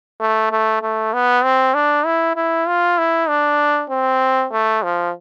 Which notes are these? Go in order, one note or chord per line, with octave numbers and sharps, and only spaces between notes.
A3
A3
A3
B3
C4
D4
E4
E4
F4
E4
D4
C4
A3
F3